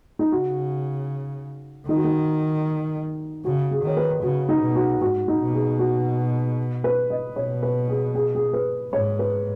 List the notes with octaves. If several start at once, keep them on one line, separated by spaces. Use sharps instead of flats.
D#4
C#3 F#4
D#3 D#4
F#4
D#4
C#3 F#4
G#4
D#3 C#5
B4
C#3 F#4
D#4
B2
F#4
G#2 F#4
D#4
B2
G#4
F#4
B4
D#5
B2 C#5
B4
G#4
G#4
G#4
B4
G#2 C#5
B4